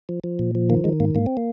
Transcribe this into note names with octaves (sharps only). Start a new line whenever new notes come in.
F3
F3
A#2
F3
D#3 A#3
D#3 G#3
G#2 A#3
G#2 A#3
C4
A#3